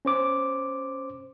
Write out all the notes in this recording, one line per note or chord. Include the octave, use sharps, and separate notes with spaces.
C#4 C5 D6